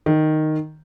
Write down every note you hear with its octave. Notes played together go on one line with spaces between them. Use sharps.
D#3